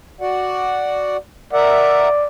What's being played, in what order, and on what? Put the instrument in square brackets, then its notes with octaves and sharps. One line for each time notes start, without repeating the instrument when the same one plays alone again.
[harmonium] F#4 D5 F#5
[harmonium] A#4 E5 F#5 [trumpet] D5